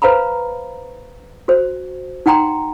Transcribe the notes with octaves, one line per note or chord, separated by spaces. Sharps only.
B4 C5 F5 A#5 B5
F#4 C5
D#4 F#5 G5 A#5 C6